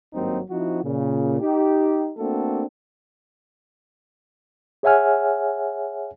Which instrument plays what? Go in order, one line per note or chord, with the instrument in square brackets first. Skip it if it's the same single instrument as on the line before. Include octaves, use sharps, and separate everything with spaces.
[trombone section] G#1 G2 F#3 A#3 C4 D#4
F3 C4 D#4 E4 F#4
A#2 C#3
D#4 G4
A3 A#3 C4 D4 F#4 A4
[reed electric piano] G#4 C#5 E5 F#5 G#5 F6